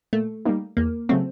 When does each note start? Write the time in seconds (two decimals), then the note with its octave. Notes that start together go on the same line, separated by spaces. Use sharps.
0.13 A#2 A3
0.45 G3 A#3 D#4
0.77 E2 A#3
1.09 C#3 F#3 A3 C4